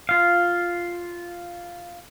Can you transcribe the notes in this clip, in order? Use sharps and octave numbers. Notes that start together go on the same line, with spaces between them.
F4 F5